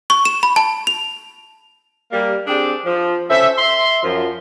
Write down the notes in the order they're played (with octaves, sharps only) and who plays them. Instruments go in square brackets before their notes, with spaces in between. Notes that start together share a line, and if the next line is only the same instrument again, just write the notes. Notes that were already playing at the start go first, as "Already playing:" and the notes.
[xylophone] C#6
E7
B5
A5
F7
[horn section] G3 A#3
C4 D4 G4 G#4 D5
F3
C#4 A4 C5 E5
E5 C6
F#2 F3